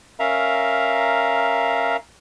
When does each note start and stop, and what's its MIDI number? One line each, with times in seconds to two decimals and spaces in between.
0.20 1.97 61
0.20 1.97 70
0.20 1.97 76
0.20 1.97 77
0.20 1.97 82